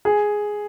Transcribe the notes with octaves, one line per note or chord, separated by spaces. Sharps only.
G#4